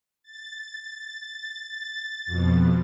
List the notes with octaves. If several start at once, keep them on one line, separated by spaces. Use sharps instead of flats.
A6
F2 B2